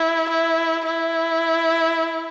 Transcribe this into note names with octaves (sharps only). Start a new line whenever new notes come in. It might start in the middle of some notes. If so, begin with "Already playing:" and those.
Already playing: E4
E4
E4